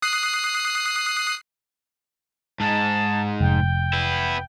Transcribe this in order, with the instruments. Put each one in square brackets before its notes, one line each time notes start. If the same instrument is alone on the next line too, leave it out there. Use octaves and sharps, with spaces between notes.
[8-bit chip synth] D#6 F#6 C7
[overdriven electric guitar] G#2 G#3 [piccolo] A5
[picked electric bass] F1 [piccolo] G5
[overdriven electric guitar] B3 E4